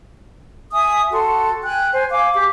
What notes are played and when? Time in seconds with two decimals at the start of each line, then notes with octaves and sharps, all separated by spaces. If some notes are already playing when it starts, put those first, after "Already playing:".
0.72 E5 G#5 D#6
1.12 F#4 A4 C6
1.63 G5 G#5 F#6
1.92 C5 G#5
2.11 F5 G#5 D6
2.34 G4 D6